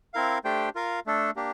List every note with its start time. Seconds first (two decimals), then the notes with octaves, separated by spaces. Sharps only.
0.14 C4 E4 A#4 F5
0.44 A3 D4 G4 C5 G5
0.75 F4 A#4 F5
1.06 A3 D4 A4
1.36 A#3 D4 G4